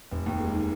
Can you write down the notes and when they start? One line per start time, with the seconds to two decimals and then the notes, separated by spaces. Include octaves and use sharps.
0.11 F1
0.26 D#2
0.40 G#3
0.54 D#3